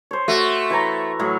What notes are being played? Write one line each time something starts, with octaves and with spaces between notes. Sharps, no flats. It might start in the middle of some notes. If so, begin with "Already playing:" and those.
C5 C#5
A3 F#4
E3 C#5 A#5
A2 F#3 C#5